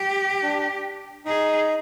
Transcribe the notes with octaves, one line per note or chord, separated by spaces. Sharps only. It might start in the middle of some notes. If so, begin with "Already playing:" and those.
Already playing: G4
D4
D#4 G#4